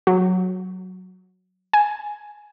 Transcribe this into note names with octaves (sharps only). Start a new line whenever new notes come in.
F#3
G#5